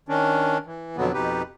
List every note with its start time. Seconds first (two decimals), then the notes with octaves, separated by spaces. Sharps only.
0.09 D#3 C#4 D4
0.66 E3
0.97 F2 B2 D3 F#3 B3
1.14 F2 B2 D#4 G4 B4